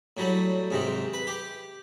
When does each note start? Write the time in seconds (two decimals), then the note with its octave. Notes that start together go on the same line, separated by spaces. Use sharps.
0.17 A2 F#3 G3
0.71 G#2 C3 D#3
1.13 B4
1.27 G4